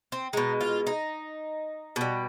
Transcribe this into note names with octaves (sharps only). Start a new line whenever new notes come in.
C4
B2 G#3 D#4
F4
D#4
B2 G3